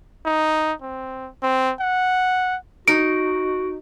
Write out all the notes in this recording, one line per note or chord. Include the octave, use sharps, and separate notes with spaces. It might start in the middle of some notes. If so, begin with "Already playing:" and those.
D#4
C4
C4
F#5
D#4 F#4 D7